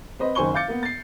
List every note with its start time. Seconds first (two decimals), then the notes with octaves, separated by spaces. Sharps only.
0.19 C4 B4 C5 D#5 B5
0.35 F#1 D#3 C5 G#5 C#6 G7
0.54 F5 D6 G6 A6 C#7
0.68 A#3 B3
0.83 A6 C7